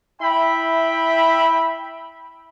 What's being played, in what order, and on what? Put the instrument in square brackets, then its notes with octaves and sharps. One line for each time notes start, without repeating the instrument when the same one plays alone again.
[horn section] E4 E5 G5 B5